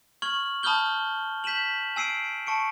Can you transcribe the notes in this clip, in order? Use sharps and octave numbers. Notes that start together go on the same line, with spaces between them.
C#6 F6 G#6 F#7
A5 B5 D#6 F6 G6 G7
G6 B6 D#7 E7 F#7
G#5 E6 C7 D7 D#7
A5 C#6 C#7 D7